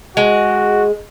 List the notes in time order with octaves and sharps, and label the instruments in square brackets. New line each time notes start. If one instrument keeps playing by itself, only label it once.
[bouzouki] G#3 [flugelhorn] F#4